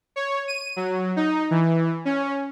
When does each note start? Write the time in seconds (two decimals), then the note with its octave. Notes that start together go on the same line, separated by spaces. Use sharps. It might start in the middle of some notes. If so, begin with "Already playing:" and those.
0.16 C#5
0.48 D#7
0.76 F#3
1.16 D#4
1.51 E3
2.05 C#4